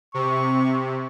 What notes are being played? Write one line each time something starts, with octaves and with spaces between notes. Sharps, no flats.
C3 C#6